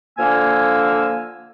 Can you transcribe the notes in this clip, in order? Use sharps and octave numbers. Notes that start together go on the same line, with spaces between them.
D3 F3 A#3 G#5 E6 F6